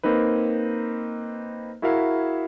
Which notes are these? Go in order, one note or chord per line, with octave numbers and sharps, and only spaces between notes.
A#3 C4 D#4 B4
E4 F#4 G#4 A#4 E5 F5